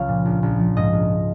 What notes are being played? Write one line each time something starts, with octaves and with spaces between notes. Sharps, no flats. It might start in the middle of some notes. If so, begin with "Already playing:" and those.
Already playing: C#2 F3 C#5 F5
A#2
A#1
A#1
F3
G#2 D#5
A#1